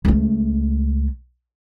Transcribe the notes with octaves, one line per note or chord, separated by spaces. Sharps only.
C#2 A3